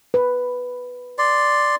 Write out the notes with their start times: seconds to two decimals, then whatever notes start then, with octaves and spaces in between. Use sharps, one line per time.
0.14 B4
1.18 D5 C6